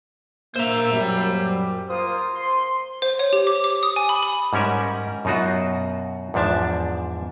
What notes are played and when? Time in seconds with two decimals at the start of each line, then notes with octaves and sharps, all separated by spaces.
0.56 A#3 C5 E5 A#5
0.93 F#2 G3
1.89 A#3 F4 C5 D#6
2.36 C6
3.02 C5
3.19 C#5
3.33 G4
3.47 D6
3.64 D6
3.83 D#6
3.96 G#5
4.09 B5
4.23 B5
4.53 G#2 G3 C#4 A#4 E5
5.25 F#2 B2 D#4 F4 F#4
6.34 E2 G#2 F3 D4 E5 A5